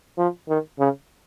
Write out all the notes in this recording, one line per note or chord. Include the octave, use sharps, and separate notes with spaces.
F3
D#3
C#3